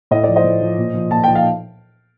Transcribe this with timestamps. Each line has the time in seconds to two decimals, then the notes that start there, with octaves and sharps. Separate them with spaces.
0.11 A2 D#5
0.24 F3 D5
0.36 C5 D#5
0.44 A2
0.61 F3
0.78 A#2
0.94 F3
1.11 A#2 A5
1.24 F3 G5
1.35 F5